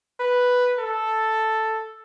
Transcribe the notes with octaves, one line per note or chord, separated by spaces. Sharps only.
B4
A4